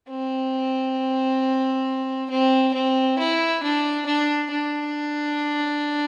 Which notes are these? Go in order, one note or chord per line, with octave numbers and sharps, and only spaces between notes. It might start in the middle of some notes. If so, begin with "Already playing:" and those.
C4
C4
C4
E4
D4
D4
D4